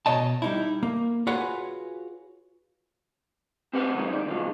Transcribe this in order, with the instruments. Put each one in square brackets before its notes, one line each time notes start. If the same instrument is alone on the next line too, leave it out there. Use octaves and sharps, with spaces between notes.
[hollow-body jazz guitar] B2 C#5 D#5 A5
G3 D#4 E4
A#3
F4 F#4 G#4 B4 C#5 F#5
[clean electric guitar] C4 G4 B4 C5 F#5
D#3 E3 F#3 G#3 D#4
G2 B2 D5
B2 D3 D#3 F3 F#3 G#3